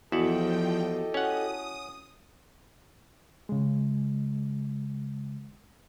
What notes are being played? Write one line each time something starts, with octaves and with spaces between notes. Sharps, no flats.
E2 F3 E4 F#4 G4 A4 D#5 G5
C#4 F#5 D#6
C#3 G#3